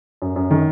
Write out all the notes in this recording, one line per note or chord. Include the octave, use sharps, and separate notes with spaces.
F#2
F#2
D#3